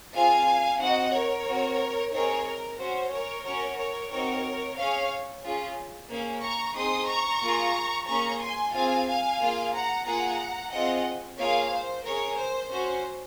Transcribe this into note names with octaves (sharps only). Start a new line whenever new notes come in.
C4 F4 G#4 F5 G#5
C4 D#4 F#4 D#5 F#5
A#4 C#5
C4 F#4
C4 D#4 G#4 A#4 C#5
A#4
C#4 F#4 C5
A#4 C#5
C#4 F#4 A#4 C#5
A#4 C#5
C4 D#4 F#4 A#4 C#5
C#4 G#4 C#5 F5
C#4 F4 G#4
A#3 C#4 G#4
A#5 C#6
C4 D#4 G#4 C6 D#6
A#5 C#6
A#3 F4 G#4
A#3 C#4 G#4 A#5 C#6
G#5 C6
C4 F4 G#4 F5 G#5
F5 G#5
A#3 F4 G#4
F#5 A#5
A#3 F4 G#4 F#5 A#5
C4 F4 G#4 D#5 F#5
A#3 F4 G#4 C#5 F5
C5
C#4 G#4 A#4 C#5
C5
C#4 F#4 C5